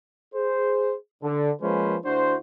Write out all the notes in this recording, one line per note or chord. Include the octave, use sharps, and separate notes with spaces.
G#4 C5
D3
F3 G#3 A#3 C#4 B4 C5
D2 D4 E4 F#4 C5